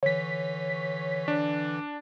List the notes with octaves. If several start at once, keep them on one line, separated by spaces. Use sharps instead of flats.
D3 E3 C#5 B6
D4